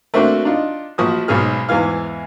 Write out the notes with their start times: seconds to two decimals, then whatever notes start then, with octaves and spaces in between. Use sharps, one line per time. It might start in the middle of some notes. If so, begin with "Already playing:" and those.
0.14 A3 A#3 C4 D4 F#4
0.45 D4 D#4 F4
0.98 A#1 F3 F#4 D#6
1.28 B1 G#2 C#4 G#4 F6
1.69 E2 G#2 E3 F5